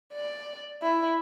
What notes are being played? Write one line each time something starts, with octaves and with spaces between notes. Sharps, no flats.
D5
E4